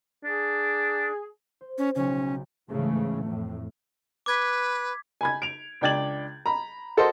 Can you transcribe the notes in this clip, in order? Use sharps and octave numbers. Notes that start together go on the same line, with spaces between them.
D4 G#4
C5
C#4
B1 C#3 C#4
G4
G#2 C#3 E3 A3
F2 A2
B4 D6 G#6 B6
G#5 B5 G#6
D7 F7
C#2 D4 G5 G#6 A6 F#7
A#5 B5
F#4 A4 A#4 C5 D#5 C6